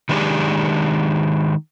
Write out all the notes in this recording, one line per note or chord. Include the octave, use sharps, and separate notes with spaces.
D#3 G#3 B3 D4 G4 G#4